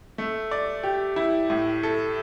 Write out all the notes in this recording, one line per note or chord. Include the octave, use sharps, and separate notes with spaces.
A3
D5
G4
E4
A2
A4